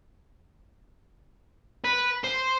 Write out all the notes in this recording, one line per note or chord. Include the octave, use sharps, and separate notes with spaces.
B4
C5